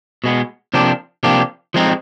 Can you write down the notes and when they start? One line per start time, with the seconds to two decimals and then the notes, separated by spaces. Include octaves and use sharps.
0.24 B2 G#3 B3
0.74 C3 F3 A#3 D4 G4
1.23 C3 F3 A#3 D4 G4
1.74 F3 G#3 C4 D#4